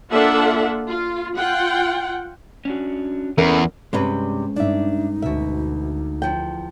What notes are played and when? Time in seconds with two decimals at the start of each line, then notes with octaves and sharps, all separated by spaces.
0.11 A#3 D4 F4 A4 E5 F#5
0.88 F4
1.36 F4 F#5 G5
2.65 C#4 D4 F#4
3.38 E2 C#4 A#4 A#5
3.93 G2 C3 G#3 C4 C#4 B4
4.56 G2 D4 D#4 E5
5.22 D2 B2 E5
6.22 E2 F3 G5